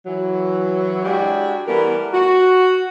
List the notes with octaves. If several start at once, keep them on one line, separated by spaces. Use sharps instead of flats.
E3 F#3
G#3 D4 E4 F#4 G4
E3 G3 A3 B3 A#4
F#4